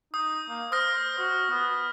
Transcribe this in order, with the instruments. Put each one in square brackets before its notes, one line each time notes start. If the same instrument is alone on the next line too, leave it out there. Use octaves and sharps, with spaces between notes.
[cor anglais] D#4 [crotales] D#6 G6
[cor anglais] A#3
[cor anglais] C5 [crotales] D#6 F6 A#6
[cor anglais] F#4
B3